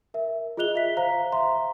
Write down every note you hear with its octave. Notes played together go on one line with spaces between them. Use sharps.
A#4 E5
F4 G#4 D#5 F#6 F7 G7
E5 B6
C5 F5 A#5
E5 A#5 C6